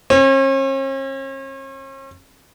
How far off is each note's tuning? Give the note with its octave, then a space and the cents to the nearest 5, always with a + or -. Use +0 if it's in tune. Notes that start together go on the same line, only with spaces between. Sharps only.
C#4 -45